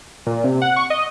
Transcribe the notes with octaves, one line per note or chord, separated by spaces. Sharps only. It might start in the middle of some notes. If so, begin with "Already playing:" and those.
A#2
C3
F#5
C#6
D#5